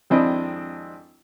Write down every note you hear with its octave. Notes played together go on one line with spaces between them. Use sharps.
G#1 F2 C4 D4 E4 D#5